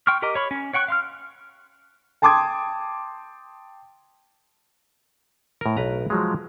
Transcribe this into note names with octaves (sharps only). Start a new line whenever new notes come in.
G5 C6 C#6 F6
G4 A#4 D#5 A#5 D6
C#5 B5 C#6
C#4
C#5 F#5 G5 C#6 F#6
F5 C6 F6
G5 A5 C6 D6 D#6 G#6
A2 A#4
B1 B4 A#5
F3 F#3 G#3